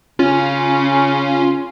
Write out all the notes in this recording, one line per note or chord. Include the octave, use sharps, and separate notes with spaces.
C#3 C#4 F4